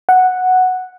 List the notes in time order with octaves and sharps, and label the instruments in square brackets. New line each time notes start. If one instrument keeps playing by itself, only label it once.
[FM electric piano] F#5